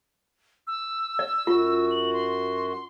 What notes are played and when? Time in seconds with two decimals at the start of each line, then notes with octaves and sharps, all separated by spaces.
0.67 E6
1.19 D5
1.47 F#2 F4 F#4
1.91 F#7
2.13 C6